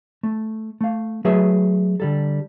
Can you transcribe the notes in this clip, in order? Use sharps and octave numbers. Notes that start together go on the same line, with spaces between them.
A3
A3 F5
F#3 A3 G#4 B4 E5
D3 G3 A4